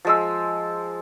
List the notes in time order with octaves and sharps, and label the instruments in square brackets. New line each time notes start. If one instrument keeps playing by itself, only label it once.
[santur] F3 G#3 E6